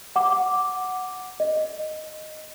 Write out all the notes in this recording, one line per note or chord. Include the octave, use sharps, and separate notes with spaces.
F#5 D6
D#5